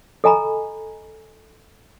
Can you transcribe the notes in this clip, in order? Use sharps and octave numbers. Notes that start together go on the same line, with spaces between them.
A4 D#5 G#5 A#5 B5